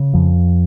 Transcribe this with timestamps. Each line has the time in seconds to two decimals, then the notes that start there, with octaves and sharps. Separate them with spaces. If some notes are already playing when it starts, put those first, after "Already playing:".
Already playing: C#3
0.14 F2 F3